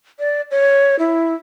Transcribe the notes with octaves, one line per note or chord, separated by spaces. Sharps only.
D5
C#5
E4